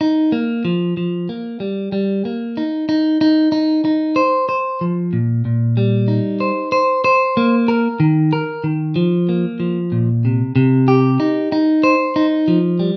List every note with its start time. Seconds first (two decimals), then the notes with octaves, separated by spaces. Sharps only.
0.01 D#4
0.32 A#3
0.65 F3
0.97 F3
1.29 A#3
1.60 G3
1.92 G3
2.25 A#3
2.57 D#4
2.89 D#4
3.21 D#4
3.52 D#4
3.85 D#4
4.16 C5
4.49 C5
4.81 F3
5.13 A#2
5.45 A#2
5.77 G3
6.08 D#4
6.40 C5
6.72 C5
7.04 C5
7.37 A#3
7.68 A#4
8.00 D#3
8.33 A#4
8.64 D#3
8.96 F3
9.29 A#3
9.60 F3
9.92 A#2
10.25 C3
10.56 C3
10.88 G4
11.20 D#4
11.52 D#4
11.84 C5
12.16 D#4
12.48 F3
12.79 G3